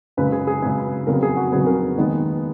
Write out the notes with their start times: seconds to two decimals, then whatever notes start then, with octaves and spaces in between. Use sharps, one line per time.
0.17 F#2 C#3 G#3 B4
0.32 G#4
0.47 G#4
0.62 F#2 C#3 G#3 G#4
1.07 F2 C#3 F#3 B3 A#4
1.23 G#4
1.37 F#4
1.52 F2 C#3 F#3 B3 G#4
1.67 A#4
1.97 D#2 D#3 G#3 B3